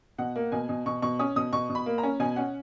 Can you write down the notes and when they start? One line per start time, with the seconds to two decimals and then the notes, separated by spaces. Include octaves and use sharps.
0.18 B2 F#5
0.36 A#3
0.52 B2 G#5
0.69 B2
0.86 B2 C#6
1.02 B2 C#6
1.19 C#4 D#6
1.36 B2 D#6
1.53 B2 C#6
1.70 B2
1.75 B5
1.86 A#3
1.98 A#5
2.03 C#4
2.20 B2 G#5
2.36 C#4 F#5